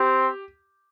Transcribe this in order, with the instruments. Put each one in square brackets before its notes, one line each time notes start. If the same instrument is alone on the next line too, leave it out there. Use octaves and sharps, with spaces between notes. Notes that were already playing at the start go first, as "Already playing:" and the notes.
Already playing: [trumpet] C4 [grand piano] G4